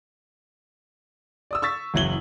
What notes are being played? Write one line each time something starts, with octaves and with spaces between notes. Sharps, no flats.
D5 D#6 E6
C#6 E6 A6 B6
F#1 E3 F#3 G#6 F#7 G7